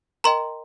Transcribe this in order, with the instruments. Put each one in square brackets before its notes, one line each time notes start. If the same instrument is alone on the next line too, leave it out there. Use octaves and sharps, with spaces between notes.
[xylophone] A#4 D#5 G5 A#5 C6